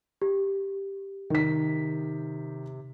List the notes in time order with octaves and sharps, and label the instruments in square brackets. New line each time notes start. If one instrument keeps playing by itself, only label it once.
[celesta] G4
[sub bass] C3 [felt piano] D#3 B6